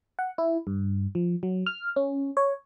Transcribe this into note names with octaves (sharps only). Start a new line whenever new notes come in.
F#5
E4
G2
F3
F#3
F6
C#4
C#5